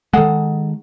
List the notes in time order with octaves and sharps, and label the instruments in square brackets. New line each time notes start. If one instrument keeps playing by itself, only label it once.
[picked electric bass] D#3 G#3 [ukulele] G#4 A4 F#5